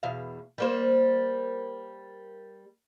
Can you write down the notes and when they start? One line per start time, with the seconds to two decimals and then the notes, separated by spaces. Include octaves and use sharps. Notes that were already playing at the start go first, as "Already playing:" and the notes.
0.03 E2 B2 F5
0.58 G3 A#3 C5